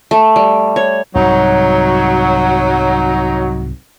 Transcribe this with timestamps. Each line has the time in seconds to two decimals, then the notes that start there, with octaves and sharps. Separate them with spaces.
0.11 A3
0.36 G3
0.76 C#5
1.15 C2 G#2 F#3 D#4